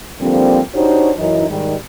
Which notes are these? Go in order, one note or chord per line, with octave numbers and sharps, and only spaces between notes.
D3 F3 G3 A#3 C4
D4 D#4 F#4 G4 C5 C#5
F#2 E3 D#4
G#2 D#3 G3